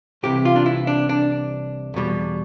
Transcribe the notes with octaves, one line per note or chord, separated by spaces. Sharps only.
C2 C3 E3 G4
F4
D4
E4
D4
D4
E2 B2 G3